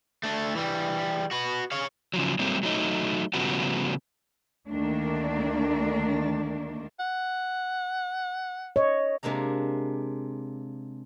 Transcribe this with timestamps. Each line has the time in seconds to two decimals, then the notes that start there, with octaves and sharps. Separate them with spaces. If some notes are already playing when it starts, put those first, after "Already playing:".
0.23 A3 D4
0.55 E3 G3
1.31 F#4 B4
1.71 C#5 F5
2.14 C#3 F3 F#3
2.39 F#3 G3 A3 A#3 C4
2.63 F#3 A3 D#4 D#5
3.34 C#3 F3 G3 A3 B3 F#4
4.70 D2 D#3 A3 A#3 D4
7.00 F#5
8.76 C#5 D#5
9.23 C3 G#3 A#3 D4 A#5